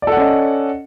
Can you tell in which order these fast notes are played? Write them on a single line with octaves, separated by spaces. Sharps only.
D5 A4 F#5 C#4 D#5